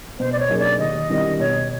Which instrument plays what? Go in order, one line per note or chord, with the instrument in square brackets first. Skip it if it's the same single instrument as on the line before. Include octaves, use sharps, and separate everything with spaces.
[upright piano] B2 [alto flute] C5
[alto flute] D5
C#5
[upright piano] F#3 A#3 D#4 G#4
[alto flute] D5
[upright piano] D#2 [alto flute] D#5
[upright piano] D#3 G3 C4 E4
[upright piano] B2 [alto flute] C#5